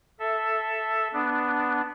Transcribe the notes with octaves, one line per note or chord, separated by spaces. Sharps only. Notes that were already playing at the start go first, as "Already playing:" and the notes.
A4 E5
B3 D4